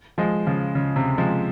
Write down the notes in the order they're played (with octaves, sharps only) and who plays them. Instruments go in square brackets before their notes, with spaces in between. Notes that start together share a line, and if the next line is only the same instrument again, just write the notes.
[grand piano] F3 G#3
C#3 F3
C#3
C3
F3 G#3